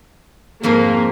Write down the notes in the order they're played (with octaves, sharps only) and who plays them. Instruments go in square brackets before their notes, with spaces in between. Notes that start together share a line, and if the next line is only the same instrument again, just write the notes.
[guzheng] F2 G#2 F4 [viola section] A#3